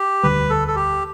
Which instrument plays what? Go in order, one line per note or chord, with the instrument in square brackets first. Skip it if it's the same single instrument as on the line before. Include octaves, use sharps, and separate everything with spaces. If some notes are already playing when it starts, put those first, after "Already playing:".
Already playing: [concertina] G4
[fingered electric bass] E1 D2 D3 G3 [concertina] B4
[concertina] A4
A4
G4